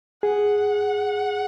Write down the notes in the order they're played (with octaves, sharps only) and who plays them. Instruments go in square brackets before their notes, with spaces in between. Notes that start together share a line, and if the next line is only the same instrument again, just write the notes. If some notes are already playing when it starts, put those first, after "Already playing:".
[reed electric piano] G#4 [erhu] F#5